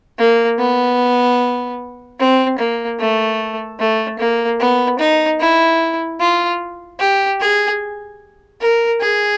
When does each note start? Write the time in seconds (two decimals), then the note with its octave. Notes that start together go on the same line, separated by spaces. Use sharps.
0.18 A#3
0.59 B3
2.19 C4
2.58 A#3
2.99 A3
3.79 A3
4.19 A#3
4.60 B3
4.99 D#4
5.40 E4
6.20 F4
7.00 G4
7.40 G#4
8.61 A#4
9.01 G#4